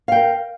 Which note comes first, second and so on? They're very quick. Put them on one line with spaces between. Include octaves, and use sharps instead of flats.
F5 G5 A#4